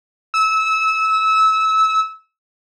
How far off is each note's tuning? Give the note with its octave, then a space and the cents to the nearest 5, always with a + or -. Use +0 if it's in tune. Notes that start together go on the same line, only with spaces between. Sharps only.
E6 -25